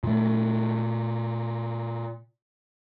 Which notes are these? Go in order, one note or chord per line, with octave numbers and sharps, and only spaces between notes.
A#2 A3